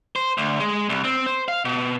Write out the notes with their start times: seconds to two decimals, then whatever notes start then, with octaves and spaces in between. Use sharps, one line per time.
0.16 C5
0.38 D2
0.60 G#3
0.89 C2
1.04 C4
1.26 C5
1.48 F5
1.65 B2